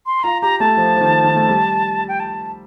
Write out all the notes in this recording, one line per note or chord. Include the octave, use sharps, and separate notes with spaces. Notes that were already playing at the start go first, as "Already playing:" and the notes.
C6
F4 A#5
G4 A#5
A3 A5
F3
F3
D#3
D#3
A3
G3
G5
A5